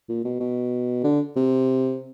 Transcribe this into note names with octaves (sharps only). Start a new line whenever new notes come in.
A#2
B2
B2
D3
C3